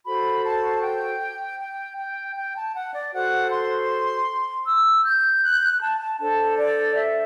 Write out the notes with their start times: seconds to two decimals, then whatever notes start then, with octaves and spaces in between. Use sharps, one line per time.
0.05 F#4 A4 C5 B5
0.44 A5
0.82 G5
1.59 G5
1.97 G5
2.36 G5
2.55 A5
2.74 F#5
2.93 D5
3.12 F#4 A4 C5 F#5
3.50 C6
4.66 E6
5.04 G6
5.43 F#6
5.52 G6
5.62 F#6
5.81 A5
6.01 A5
6.19 D4 A4 C5 A5
6.58 D5
6.96 E5